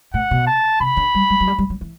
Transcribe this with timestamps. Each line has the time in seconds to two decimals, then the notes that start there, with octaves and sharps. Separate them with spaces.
0.14 A2 F#5
0.31 B2
0.47 A5
0.80 C3 B5
0.97 D3
1.15 G3
1.30 G3
1.40 F#3
1.47 G3
1.58 G3
1.70 F#3
1.81 E3